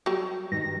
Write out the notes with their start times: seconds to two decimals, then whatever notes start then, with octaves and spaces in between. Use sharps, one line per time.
0.06 F#3 G3
0.52 G2 D#3 D#4 A#6